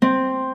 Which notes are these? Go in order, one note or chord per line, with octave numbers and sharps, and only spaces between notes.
C4